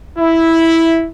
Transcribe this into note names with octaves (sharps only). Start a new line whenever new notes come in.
E4